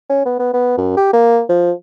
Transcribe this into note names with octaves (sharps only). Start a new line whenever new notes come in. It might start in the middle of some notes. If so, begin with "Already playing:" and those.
C#4
B3
B3
B3
F#2
G4
A#3
F3